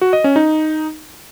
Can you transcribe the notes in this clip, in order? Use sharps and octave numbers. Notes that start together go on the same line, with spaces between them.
F#4
D#5
C#4
D#4